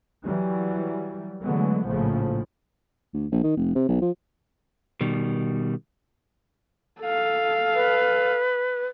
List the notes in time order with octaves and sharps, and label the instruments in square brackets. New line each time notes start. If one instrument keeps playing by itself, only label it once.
[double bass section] E3 F#3 G3
D3 E3 F#3 G#3 A3 B3
A#1 A2 C#3 F3 A3
[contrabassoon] D2
A#1
D#3
F1
C3
B1
F3
[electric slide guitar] B2 D#3 G3
[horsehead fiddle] A4 F5
[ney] B4